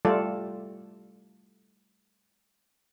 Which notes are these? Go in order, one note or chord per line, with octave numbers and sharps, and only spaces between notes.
G3 A3 F4 A4 D5